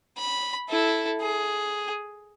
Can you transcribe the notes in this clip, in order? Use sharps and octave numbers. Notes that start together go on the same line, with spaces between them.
B5
E4 A4
G#4